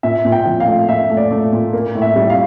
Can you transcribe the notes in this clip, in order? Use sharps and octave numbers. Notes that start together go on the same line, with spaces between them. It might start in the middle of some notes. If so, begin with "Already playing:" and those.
A#2 E5
A#2
G5
F3
F5
A3
A#2 E5
A3
D5
A3
A#2
A#3
A2
E5
G3
F5